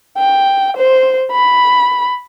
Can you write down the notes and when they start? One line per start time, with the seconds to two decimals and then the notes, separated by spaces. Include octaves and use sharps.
0.18 G5
0.77 C5
1.32 B5